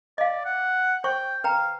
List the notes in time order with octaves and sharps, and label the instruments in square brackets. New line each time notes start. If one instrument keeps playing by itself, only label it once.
[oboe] D5 [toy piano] D#5 F5
[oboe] F#5
[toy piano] C5 C#6 [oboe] G5
[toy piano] B4 G5 A#5 [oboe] F5